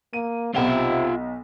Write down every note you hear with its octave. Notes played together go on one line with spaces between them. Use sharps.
A#3 D#7
B1 C3 F4 E5 F#5 G7